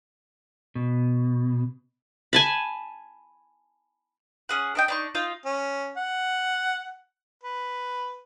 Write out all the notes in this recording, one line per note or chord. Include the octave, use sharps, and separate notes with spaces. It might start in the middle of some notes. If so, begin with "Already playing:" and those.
B2
G#5 A5 B5
C#4 G#4 F#5
D4 D#5 G5
D4 D#4 C#6
D#4 F4 F5
C#4
F#5
B4